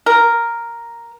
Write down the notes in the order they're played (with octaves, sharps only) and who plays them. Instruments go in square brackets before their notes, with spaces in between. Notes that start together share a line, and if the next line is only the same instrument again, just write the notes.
[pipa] A#4